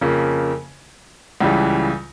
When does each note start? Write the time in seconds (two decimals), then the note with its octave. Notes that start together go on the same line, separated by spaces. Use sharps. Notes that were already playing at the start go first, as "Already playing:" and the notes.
0.01 F2 C#3 F3 A#3
1.41 C#2 C#3 E3 G3